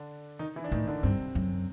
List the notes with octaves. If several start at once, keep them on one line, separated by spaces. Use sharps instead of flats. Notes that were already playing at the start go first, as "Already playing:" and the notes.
Already playing: D3 D4
D#3 D#4
E3 E4
D4
A2 D#3 D#4
D3 D4
G2 C3 C4
F#2